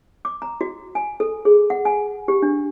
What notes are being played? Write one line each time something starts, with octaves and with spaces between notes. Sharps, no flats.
D6
A#5
F#4
G#5
A4
G#4
F#5
G#5
G4
D4